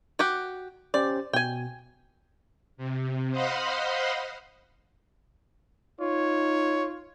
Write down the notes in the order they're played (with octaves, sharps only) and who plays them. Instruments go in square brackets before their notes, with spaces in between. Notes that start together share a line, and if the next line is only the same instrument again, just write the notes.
[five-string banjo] F#4 G4 F#5
[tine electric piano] C#4 G4 C5 [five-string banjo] D5
[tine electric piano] B2 [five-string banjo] G5 G#5
[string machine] C3
C5 D#5 F5 F#5 B5 C6
[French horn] D#4 [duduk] F4 [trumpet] C#5